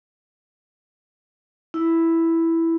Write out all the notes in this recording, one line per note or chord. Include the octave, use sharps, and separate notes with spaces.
E4